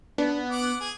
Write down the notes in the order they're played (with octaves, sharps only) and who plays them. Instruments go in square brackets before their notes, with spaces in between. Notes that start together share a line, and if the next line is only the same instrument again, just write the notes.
[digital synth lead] B3 [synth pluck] D4
[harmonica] F#5 D6
G#4